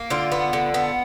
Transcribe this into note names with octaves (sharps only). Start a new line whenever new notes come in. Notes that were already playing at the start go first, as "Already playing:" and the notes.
Already playing: A#3
D3 F4
B3
D3
B3